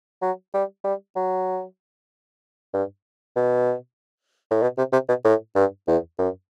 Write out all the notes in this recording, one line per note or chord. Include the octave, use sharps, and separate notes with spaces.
F#3
G3
G3
F#3
G2
B2
A2
B2
C3
C3
B2
A2
G2
E2
F#2